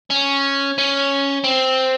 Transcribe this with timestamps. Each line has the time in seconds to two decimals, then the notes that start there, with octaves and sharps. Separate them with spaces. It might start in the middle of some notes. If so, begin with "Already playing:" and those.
0.10 C#4
0.78 C#4
1.44 C4